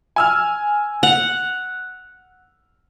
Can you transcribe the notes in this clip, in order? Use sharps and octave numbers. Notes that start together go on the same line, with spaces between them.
G#5 E6 F6
F#5 F7